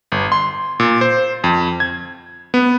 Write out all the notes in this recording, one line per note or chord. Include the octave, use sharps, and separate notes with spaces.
G1
C6
A#2
C5
F2
G#6
B3